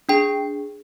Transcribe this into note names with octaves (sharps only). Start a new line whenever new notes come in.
D4 G#4 G5